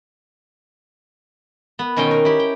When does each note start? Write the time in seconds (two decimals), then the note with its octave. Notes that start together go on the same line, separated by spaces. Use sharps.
1.79 B3
1.96 B2 D#3 C#4 D#4 G5 C6
2.11 A#4
2.25 E4 G4
2.39 G5